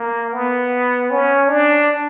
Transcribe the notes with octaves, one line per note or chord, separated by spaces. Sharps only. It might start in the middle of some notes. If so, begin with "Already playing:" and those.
Already playing: A#3
B3
C#4
D4